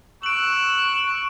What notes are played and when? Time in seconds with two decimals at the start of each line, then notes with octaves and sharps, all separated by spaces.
0.23 C#6 E6 F#6 D7 F#7